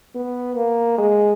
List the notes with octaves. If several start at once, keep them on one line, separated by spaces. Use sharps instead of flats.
B3
A#3
G#3